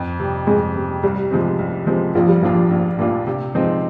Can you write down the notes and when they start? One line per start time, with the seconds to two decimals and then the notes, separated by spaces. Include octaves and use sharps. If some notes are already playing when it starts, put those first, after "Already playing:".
Already playing: F2
0.19 C3 G3
0.47 F2 G#3
0.75 C3 G3
1.03 C2 G3
1.31 C3 F3 G#3 C4
1.59 C2
1.86 C3 F3 G#3 C4
2.15 A#1 F3
2.28 G3
2.42 A#2 F3 G3 D4 F4
2.71 A#1
2.99 A#2 G3 D4 F4
3.27 C3
3.55 F3 G#3 C4 D#4